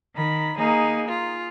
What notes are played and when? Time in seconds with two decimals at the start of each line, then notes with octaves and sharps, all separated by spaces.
0.16 D#3 B5
0.57 A#3 D#4 G#4
1.08 F4